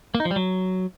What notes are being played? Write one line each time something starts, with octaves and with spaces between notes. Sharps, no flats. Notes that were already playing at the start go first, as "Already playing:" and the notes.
A#3
D#4
F3
G3
F#3